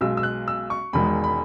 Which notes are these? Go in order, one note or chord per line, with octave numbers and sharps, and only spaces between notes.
B1 B2 G#3 E6
E6
F#6
E6
C#6
E1 E2 D#3 G#3 B5
B5